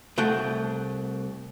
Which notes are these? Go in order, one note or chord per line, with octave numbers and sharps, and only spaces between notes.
C2 A3 F#5 G5